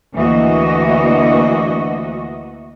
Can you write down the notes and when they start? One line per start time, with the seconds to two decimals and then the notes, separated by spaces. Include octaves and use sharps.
0.14 D2 E3 A#3 F#4 D#5